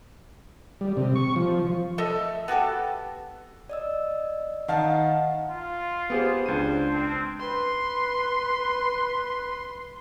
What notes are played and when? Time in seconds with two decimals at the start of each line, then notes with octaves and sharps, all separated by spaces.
0.81 G3
0.97 C3
1.16 C#6
1.36 F3
1.98 A3 A4 D#5 E5
2.48 B3 F#4 G4 A4
3.70 D5 D#5 E6
4.68 D#3 D#5 F5 F#5 A5
5.50 F4
6.10 B3 G4 G#4 C5
6.46 C#2 D4 C5 D#7
6.93 C4
7.40 B4 C6